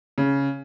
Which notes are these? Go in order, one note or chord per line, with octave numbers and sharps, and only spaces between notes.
C#3